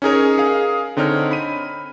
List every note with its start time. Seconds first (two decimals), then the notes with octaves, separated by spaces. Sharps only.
0.02 C#4 D#4 G#4 A#4 C#5
0.38 G#4 F5
0.97 D3 C4 D#4 C#5 F6
1.31 B5 D#7